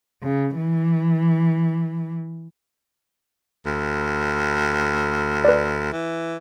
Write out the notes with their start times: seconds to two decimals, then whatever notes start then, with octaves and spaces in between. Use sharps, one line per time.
0.23 C#3
0.57 E3
3.66 D2
5.45 B4 D5
5.92 E3